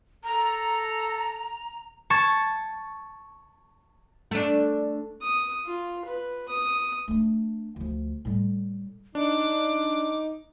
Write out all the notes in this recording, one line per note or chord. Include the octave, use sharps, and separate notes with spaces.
A4 A#5
A5 C#6 G#6 A6 C#7 E7
A3 D4
D#6
F4
B4
D#6
A3 D4
D2 F3
A2 G3
D4 D#4 D6